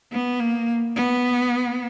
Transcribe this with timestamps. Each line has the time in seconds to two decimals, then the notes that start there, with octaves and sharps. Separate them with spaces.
0.12 B3
0.40 A#3
0.96 B3